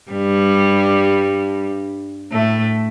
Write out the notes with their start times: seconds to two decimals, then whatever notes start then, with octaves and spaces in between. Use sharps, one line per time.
0.11 G2 G3
2.32 A2 A3